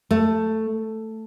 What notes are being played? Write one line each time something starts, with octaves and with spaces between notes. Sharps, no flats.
A3